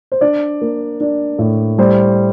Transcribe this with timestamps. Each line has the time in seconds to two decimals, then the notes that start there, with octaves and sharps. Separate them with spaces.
0.12 C5
0.21 D4 D5
0.61 A#3
1.01 D4
1.39 A2
1.78 G3 C5